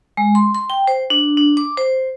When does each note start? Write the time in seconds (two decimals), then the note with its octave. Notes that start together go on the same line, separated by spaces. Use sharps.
0.17 G#3
0.35 C6
0.55 C6
0.70 G5
0.87 C5
1.10 D4
1.37 D4
1.57 D6
1.77 C5